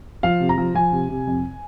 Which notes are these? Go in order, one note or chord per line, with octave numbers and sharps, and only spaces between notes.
F3 F5
C3
A#5
F3
F3 G#5
C3
C3
F2